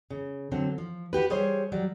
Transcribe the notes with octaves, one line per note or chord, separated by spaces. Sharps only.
C#3
D3 F#3 C4
F3
F#4 G4 B4
G3 G#4 C5 C#5
F#3 G3